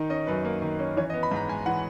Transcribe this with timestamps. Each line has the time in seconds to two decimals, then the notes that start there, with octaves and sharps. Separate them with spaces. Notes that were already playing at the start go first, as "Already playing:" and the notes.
Already playing: D#3 D#4
0.10 C#4 D#5
0.27 F#2 B4
0.45 A#3
0.62 D#3
0.79 C#4
0.97 E3 C#5
1.10 D#5
1.14 B3
1.23 B5
1.31 G#2 A#5
1.48 G#3 G#5
1.66 E3 F#5